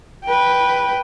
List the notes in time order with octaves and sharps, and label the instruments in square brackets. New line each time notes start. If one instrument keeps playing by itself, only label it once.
[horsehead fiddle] B4 G5